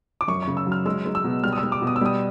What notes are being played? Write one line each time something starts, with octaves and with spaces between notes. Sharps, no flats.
D6
F#2 C#6
C#3 C#6
E6
F#3
F6
G#3 E6
G#3
E6
B2
G3 F6
D#6
E6
G3
D6
B2
D#6
E6
G3 D#6